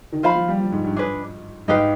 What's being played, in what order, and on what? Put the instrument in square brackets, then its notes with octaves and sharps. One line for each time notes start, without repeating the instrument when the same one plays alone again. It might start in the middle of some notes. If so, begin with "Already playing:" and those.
[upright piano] D#3
[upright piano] F3 [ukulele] F4 C5 F5 B5
[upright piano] F3
G3
F3
G#2
G2
[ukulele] D4 G#4 B4
[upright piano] G#2 [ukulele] D#4 G4 B4 F5